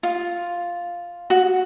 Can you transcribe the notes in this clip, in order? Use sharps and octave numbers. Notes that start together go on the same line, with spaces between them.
F4
F#4